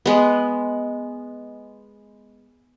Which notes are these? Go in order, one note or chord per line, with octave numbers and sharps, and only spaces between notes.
G#3 B3